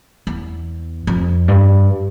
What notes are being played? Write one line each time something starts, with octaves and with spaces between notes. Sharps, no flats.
E2
F2
G2